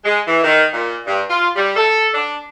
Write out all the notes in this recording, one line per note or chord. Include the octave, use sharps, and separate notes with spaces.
G#3
E3
D#3
A#2
G2
F4
G3
A4
D4